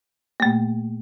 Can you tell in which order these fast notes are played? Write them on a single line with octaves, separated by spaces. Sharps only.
A#3 A3 A#2